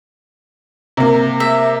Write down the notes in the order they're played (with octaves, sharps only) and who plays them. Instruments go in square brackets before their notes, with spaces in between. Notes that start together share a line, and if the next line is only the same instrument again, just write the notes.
[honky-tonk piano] C3 A#3
[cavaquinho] E5